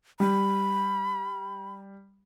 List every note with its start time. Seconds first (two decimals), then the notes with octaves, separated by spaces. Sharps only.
0.20 G3 B5